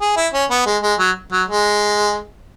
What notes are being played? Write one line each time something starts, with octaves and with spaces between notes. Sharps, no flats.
G#4
E4
C#4
B3
G#3
G#3
F#3
F#3
G#3